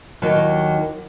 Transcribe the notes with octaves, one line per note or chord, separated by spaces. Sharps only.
D#2 D#3 F#3